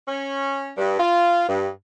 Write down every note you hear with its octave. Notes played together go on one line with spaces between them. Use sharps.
C#4
G2
F4
G2